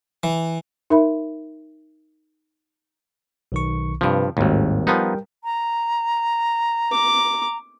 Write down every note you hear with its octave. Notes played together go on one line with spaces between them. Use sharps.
E3
D#4 A#4 E5 B5
B1 D#3 C#6
G2 C3 F3 B4
G#1 D#2 A2 G3 G#3
F3 G3 B3 D#4 A#4 G5
A#5
D6